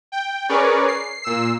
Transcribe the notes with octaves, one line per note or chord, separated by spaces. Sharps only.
G5
C#4 G#4 A#4 B4 C#5 D5
C7
A#2 E6 C7